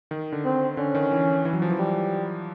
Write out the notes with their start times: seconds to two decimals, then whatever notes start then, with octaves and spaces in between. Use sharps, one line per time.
0.11 D#3
0.32 D3
0.44 C4
0.77 D3 C#4
0.95 D#3
1.11 E3
1.45 E3
1.53 F#3
1.62 F3
1.70 E3
1.79 G3